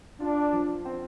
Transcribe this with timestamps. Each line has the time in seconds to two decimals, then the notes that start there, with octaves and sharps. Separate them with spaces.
0.20 D4 F4
0.53 F3
0.85 C4